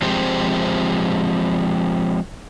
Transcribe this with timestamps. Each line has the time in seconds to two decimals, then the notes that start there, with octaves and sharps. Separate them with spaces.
0.02 F3 G#3 C4 G4 C5